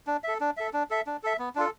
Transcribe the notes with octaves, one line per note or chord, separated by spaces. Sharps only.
D4
A4 E5
D4
A4 E5
D4
A4 E5
D4
A4 E5
B3
D4 F4 A4